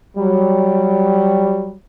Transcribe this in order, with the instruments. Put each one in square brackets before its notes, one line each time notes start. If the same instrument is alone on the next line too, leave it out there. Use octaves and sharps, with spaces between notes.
[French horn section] F#3 G3